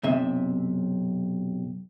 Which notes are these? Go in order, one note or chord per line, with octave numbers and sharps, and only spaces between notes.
B1 F#2 C3 E5